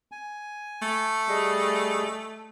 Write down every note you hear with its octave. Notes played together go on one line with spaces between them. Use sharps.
G#5
A3
G3 G#4 D#5